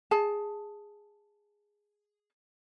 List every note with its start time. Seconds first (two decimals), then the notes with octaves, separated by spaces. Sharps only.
0.11 G#4 A5